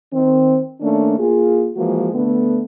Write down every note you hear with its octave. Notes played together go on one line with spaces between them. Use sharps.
D#3 C4
D#3 A3 A#3 C#4 D4
A#3 F4 G#4
E3 F3 G#3 A#3 F#4
D3 A3 B3